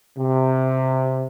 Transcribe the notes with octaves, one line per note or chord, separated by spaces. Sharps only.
C3